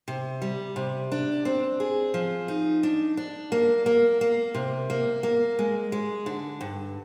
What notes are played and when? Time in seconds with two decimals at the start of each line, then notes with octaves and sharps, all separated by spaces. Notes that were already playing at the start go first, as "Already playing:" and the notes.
0.08 C3
0.42 G3
0.76 C3
1.12 D4
1.45 C4
1.80 G#4
2.14 F3
2.48 D#4
2.83 D4
3.17 D4
3.52 A#3
3.86 A#3
4.21 A#3
4.54 C3
4.90 A#3
5.23 A#3
5.59 G#3
5.92 G#3
6.26 D3
6.61 G2